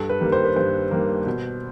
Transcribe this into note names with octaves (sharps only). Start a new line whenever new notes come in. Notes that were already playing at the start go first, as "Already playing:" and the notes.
Already playing: G2 A4
B4
D#3 G3 A#3
C5
B4
G2 C5
D#3 G3 A#3
B2